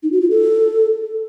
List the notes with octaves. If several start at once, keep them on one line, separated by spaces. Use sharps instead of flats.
D#4
F#4
F4
A4